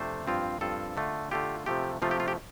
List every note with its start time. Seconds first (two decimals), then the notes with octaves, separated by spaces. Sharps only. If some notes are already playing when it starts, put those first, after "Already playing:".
Already playing: F2 C3 A3 D4 C5
0.27 G2 F3 C4 F4
0.61 G2 F3 C4 F4 A4
0.97 D3 A3 F4
1.31 D3 A3 F4 G4
1.66 C3 F3 A3 G4
2.02 C3 F3 A3 F4
2.11 G4
2.20 F4
2.28 G4